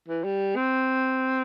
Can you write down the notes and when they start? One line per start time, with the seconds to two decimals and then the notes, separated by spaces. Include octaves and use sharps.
0.09 E3
0.24 G3
0.56 C4